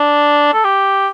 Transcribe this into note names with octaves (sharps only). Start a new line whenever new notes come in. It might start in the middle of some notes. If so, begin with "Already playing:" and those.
Already playing: D4
A4
G4